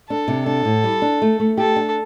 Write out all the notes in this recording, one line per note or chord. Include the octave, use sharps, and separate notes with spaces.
D4 A4
C3
D4 A4
A2
G3
D4
A3
A3
G4 A4
D4